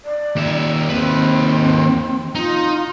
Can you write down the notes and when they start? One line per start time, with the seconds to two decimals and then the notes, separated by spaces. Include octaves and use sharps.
0.05 D5
0.36 D#2 E5
0.89 D#2 C4 B4
2.35 D#4 F4